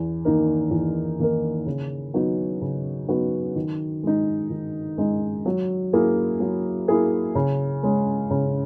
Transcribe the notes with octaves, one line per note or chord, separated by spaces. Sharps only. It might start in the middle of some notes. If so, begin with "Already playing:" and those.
Already playing: E2
D#3 A#3 D#4 A#4
E2
D#3 A#3 D#4 A#4
C#3
F#3 B3 D#4 F#4
C#3
F#3 B3 D#4 F#4
D#3
G#3 D#4
D#3
G#3 D#4
F#3
A#3 E4 G#4
F#3
A#3 E4 G#4
C#3
G#3 C#4
C#3